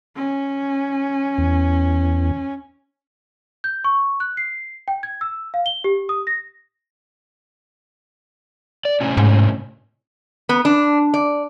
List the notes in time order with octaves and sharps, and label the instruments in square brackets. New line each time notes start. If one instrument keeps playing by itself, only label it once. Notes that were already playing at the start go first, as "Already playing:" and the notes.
[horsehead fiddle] C#4
[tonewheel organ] E2
[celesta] G6
C#6
F#6
C7
G5
G#6
E6
F5
G7
G4
D#6
A#6
[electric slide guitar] D5
A2 C3 C#4
[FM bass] G#2
[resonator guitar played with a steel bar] B3
D4
D5